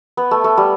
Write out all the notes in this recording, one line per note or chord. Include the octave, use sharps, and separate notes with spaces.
B3
A3
A3
G3